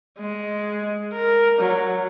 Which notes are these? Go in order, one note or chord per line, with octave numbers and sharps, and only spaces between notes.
G#3
A#4
F#3